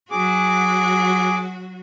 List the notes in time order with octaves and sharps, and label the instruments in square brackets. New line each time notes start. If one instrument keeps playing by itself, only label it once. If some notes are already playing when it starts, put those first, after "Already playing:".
[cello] F#3 F#4 [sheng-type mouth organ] G#4 D6